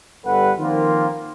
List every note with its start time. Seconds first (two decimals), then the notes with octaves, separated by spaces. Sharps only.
0.25 G1 G3 A4 B4 F#5
0.58 D#3 F3 A#3 C4 F4